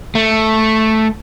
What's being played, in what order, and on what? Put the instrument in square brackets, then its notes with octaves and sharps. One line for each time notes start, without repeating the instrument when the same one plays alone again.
[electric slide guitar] A3